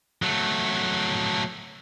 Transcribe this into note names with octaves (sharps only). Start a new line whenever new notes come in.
F#3 A3